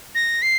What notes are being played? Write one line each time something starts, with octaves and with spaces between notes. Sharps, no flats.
A#6
C7